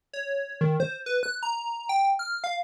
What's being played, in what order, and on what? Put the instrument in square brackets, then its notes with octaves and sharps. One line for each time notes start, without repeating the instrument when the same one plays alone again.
[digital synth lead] C#5
D#3
C5
B4
F#6
A#5
G5
F6
F5